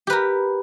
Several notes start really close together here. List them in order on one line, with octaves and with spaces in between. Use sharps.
G4 B4 A#4